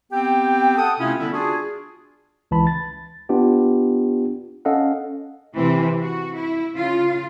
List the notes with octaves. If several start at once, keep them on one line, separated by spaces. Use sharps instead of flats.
B3 C4 G4 G5
A4 F#5 G5 D#6
C3 A3 C4 C#4 E4 F4
D3 G3 B3 E4 E5
D4 F4 F#4 G#4
C#2 E3 A5 B5
A6
B3 D4 F4 G4
C#4 A4 D#5 F5 F#5
C3 E3 C4
F#4
E4
C#3 F4